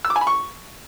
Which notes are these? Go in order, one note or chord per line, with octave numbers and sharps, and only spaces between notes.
E6
D6
G#5
B5
C#6